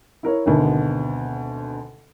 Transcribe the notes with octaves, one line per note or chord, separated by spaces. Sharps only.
E4 A#4 C#5
G#1 D2 B2